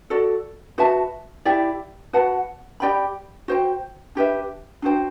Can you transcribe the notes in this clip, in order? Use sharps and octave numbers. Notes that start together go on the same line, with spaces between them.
F#4 A4 D5
F#4 B4 E5 A5
E4 G4 D5 G5
F#4 B4 F#5 A5
G4 D5 G5 B5
F#4 C5 G5
D4 G4 B4 E5
D4 F#4 C5 G5